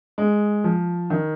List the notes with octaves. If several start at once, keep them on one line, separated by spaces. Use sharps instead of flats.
G#3
F3
D#3